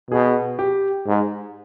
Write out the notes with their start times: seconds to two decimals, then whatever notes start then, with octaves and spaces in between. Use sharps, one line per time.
0.11 B2 G#4
0.59 G4
1.06 G#2